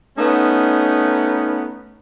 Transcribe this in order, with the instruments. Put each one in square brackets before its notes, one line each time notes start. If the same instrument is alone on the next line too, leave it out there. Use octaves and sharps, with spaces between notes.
[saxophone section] A3 B3 C#4 D#4